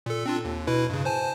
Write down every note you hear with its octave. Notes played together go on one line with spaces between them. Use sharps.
A#2 A4
C4 D4 F4
D#2
B2 E4 B4
G2 C#3
C5 G#5 A5